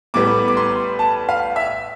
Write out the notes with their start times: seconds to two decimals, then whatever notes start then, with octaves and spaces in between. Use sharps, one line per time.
0.14 A2 G3 B3 D6
0.48 D6
0.57 C6
0.99 A5
1.29 F5
1.56 E5